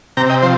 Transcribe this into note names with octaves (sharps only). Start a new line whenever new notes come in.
C3 G5 A#5
D#5 G5
F3 C5